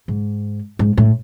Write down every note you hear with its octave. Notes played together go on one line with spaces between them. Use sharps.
G#2
G#2
A2